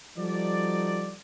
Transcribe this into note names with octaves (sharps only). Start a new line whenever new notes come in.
F3 G3 D#4 F#4 A4 D5